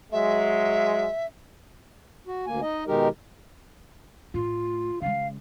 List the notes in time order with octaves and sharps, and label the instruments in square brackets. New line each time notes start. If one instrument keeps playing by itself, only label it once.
[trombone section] F#3 G#3 [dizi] E5
[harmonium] F#4
D2 A#3 G#5
D#4 D#5
B2 D#3 G#3 D#4 G4 A#4
[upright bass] A2 [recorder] F4
[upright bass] C#3 G#3 [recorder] F5